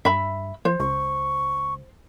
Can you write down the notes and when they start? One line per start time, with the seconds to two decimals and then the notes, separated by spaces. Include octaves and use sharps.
0.05 G2 E5 B5
0.65 F3 C5
0.80 C#2 C#6